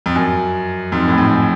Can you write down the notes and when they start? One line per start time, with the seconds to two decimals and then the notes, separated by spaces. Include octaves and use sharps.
0.06 F2
0.15 F#2
0.92 F2 G#2
1.08 A2
1.18 F2 G#2